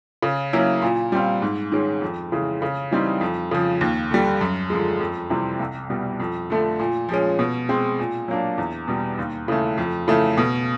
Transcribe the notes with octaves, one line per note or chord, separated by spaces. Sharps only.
C#3
F#3 A#3 C#4 E4
A#2
G3 C4 F4
G#2
D#3 G#3 C#4
F2
C#3 E3 G#3
C#3
E3 G3 C4 D#4
F2
C#3 F3
D#2
D3 G3
F#2
D3 F3 G#3
F2
C3 E3 G3 C4
C2
B2 G3
F2
D3 F3 A3
A#2
F3 G#3 C#4
B2
G#3 C4
A#2
F#3 A#3 D4
E2
B2 G3
D#2
C#3 E3 A3
F2
C#3 E3 A3
B2